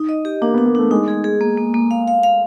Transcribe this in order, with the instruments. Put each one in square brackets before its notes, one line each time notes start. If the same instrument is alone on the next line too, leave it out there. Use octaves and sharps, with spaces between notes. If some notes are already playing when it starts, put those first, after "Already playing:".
Already playing: [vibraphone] D#4
D#5
G4
[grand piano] A#3 [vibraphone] D4
[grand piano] B3
[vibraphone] D4
[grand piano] A#3
[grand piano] A3 [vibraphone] D4
[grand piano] G#3 [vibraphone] D#4
[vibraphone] G#4
G#4
A#3
A#3
A#3
F5
F5
F5